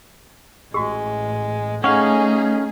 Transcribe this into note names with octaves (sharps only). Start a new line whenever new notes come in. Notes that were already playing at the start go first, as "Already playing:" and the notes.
A1 G#3 F#4 G4
A3 C#4 D#4 G#4 F5 F#5 C#6